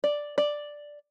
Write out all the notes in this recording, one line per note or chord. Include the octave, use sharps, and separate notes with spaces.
D5
D5